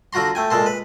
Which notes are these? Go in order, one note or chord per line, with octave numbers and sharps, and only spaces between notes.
D3 F4 F#4 A#5 C6
A3 G5 G#5
A#2 G#3 A4 C6
B4